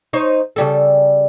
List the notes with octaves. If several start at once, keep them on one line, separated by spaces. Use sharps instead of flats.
D#4 C5 C#5
C#3 G3 A4